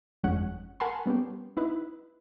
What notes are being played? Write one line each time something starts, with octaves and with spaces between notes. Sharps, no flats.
G1 F2 G#3 C#4 F#5
A#4 F#5 G#5 A5 B5 C6
G3 B3 C#4 G4
D#4 E4 B4